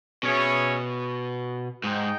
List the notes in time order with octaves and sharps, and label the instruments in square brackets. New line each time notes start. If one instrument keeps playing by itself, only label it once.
[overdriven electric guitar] B2 [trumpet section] C#4 G#4 C#5 E5
[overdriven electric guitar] G#2 [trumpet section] D#4 G#4 D#5 G5